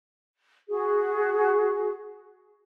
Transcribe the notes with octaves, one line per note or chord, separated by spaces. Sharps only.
F#4 G#4